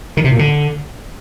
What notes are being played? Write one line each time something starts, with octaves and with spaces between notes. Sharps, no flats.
D#3
C3
A#2
D3